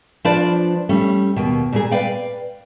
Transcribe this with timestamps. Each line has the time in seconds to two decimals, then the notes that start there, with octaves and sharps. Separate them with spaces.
0.24 F3 D4 F4 B4 C5 D5
0.89 G3 A3 C#4
1.36 D#2 B2
1.72 A#2 G3 G#4
1.91 B4 D5 F5 G5